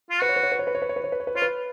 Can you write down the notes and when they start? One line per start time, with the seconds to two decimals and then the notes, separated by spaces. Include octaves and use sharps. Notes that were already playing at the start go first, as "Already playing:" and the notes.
0.11 F4
0.21 F#4 B4
0.29 C#5
0.36 B4
0.43 C#5
0.52 B4
0.59 C#5
0.67 B4
0.75 C#5
0.82 B4
0.89 C#5
0.96 B4
1.04 C#5
1.12 B4
1.20 C#5
1.27 B4
1.35 F4 C#5
1.42 B4